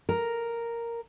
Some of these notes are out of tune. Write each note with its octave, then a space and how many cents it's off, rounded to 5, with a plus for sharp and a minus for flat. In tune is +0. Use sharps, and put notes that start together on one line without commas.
A#4 +0